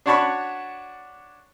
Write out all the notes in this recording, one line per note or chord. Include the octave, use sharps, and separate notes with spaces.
D4 F#4 C#5 A5 B5 C#6